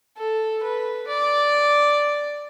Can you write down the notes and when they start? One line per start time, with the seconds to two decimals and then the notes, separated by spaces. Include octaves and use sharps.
0.18 A4
0.63 B4
1.08 D5